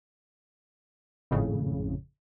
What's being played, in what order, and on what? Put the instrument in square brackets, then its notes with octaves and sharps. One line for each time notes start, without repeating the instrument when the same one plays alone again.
[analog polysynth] G#1 F2 A2 C#3